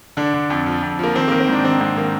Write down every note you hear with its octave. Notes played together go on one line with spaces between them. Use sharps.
D3 D4
D3
F2
F3
F2
F3 A#3
D#3 C4
D#3 A#3
C4
G#2 D4
D#3 C4
G#2 C4
D#3 A#3